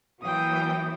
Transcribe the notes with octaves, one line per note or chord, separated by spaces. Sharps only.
E3 F#3 A#3 G5 D#6